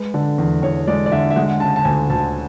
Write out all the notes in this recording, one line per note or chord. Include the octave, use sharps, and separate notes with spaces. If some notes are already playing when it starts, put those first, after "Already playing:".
Already playing: G#3 B4
D3
E2
E2 C#5
G#3 D5
D5
D3 E5
E5
G#3 F#5
C#3 A5
A5
D2 G#5
D2 A5